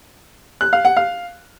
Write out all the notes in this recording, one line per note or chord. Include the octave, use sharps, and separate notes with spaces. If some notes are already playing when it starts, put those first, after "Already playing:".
F#6
F5
F#5
F5